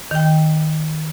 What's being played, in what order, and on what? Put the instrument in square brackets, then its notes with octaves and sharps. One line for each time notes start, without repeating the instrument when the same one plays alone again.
[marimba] D#3 G5